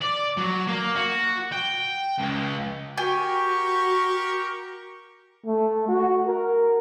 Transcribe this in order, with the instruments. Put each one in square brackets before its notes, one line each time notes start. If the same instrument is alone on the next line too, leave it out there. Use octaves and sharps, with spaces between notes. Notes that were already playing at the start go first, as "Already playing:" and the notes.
[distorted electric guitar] D5
F#3
A#3
F#4
G5
C#2
[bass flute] F#4 [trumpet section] G4 A#4 C#6 [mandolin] G5 G#5
[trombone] A3
F#4
A#4